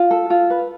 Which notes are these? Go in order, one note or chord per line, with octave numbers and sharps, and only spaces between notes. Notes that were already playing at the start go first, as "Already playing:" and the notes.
Already playing: F4
A4
F4
B4